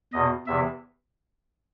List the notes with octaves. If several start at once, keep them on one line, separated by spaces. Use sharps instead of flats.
E2 B2 D#5
E2 C3 E3 E5